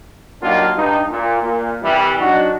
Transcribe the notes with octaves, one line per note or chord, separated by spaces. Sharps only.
F#3 G3 A#3 D4 D#4 F4
G2 D#4
A#2
A#2
C2 E3 G3
F#3 D4 D#4 F#4